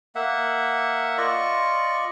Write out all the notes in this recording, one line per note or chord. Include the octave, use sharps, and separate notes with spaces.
A#3 E5 F#5
F4 D5 D#5 C#6